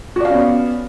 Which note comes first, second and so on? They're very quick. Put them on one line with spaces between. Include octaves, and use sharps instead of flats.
F#4 D5 F5 C#4 B3